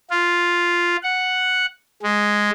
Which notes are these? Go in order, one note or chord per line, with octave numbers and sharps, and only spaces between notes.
F4
F#5
G#3